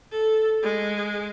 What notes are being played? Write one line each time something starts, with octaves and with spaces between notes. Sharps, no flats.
A4
G#3